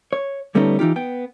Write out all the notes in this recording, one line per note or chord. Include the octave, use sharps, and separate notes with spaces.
C#5
D3 G3 A3 B3 C#4 D#4
E3 D#4 F4 G4
B3 G5